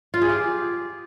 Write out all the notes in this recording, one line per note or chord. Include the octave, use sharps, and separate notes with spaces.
F4
G#4
G4